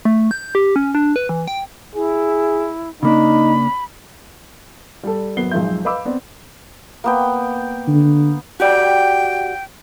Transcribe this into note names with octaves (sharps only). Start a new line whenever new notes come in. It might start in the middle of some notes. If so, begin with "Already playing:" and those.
A3
G6
G4
C#4
D4
B4
E3
G5
E4 G#4
C#3 A#3 D4 D#4 B5
G3 A4
F#1 F#3 B3 C7 G7
B1 F2 G#3 F4 E5 G6
B4 D#5 F5 B5 D6 E6
B3 C4 D5
A#3 B3 G5
D3
F#4 G4 D5 G5